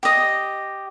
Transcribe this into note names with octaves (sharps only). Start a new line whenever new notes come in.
G4 D#5